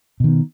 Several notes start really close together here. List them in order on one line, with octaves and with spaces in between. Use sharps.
B2 D#3 B3